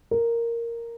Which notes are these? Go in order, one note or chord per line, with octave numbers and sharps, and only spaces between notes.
A#4